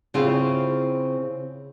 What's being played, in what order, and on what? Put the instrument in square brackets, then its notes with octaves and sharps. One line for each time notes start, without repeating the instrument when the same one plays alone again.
[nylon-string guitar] C#3 C4 E4 F4 G#4 F5